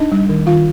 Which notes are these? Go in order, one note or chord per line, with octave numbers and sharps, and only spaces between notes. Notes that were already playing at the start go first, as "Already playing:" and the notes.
Already playing: D4 D#4 D#5
G3
D#3
D#3 F4 F5